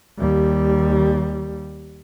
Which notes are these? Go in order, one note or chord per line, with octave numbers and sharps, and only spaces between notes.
D#2 G3